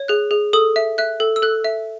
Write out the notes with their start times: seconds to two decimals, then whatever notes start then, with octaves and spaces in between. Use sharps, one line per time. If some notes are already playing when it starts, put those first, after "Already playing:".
Already playing: C#5
0.08 G#4 F#6
0.31 G#4
0.53 A4 D#6
0.76 E5
0.98 E5 F#6
1.20 A4
1.36 E6
1.42 A4 F#6
1.64 E5